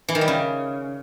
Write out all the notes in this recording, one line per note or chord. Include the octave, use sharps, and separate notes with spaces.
E3
D#3
G3
C#3